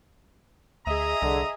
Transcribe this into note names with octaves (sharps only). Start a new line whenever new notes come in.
D2 G#4 D#5 E5 A#5 D#6
C2 D3